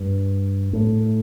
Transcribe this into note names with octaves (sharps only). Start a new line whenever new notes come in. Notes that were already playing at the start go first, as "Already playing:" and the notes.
Already playing: G2
A2